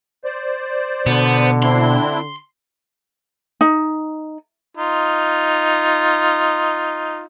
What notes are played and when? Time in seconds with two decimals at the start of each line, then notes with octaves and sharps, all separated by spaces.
0.24 C5 D5
1.07 B2 D3 B3
1.62 C4 D4 E4 C6
3.61 D#4
4.77 D#4 F4